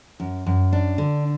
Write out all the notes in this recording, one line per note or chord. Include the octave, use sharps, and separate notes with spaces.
F#2
F#2
D4
D3